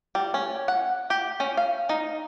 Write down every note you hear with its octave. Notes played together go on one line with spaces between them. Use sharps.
G3
C#4
F#5
G4
C#4
F5
D#4